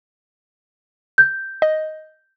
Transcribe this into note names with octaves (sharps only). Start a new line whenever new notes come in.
G6
D#5